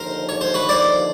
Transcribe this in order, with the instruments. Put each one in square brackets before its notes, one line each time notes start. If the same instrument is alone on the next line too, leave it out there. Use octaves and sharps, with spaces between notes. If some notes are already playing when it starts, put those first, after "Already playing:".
Already playing: [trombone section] D#2 D3 F3 [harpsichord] A#4 C5
[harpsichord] C#5
C5
B4 C#5
C5 D5